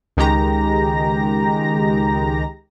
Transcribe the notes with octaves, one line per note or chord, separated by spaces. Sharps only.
C#2 D#3 G#3 G4 A#5 A#6